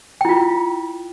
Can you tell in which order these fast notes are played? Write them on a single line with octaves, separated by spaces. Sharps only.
G5 E4 F4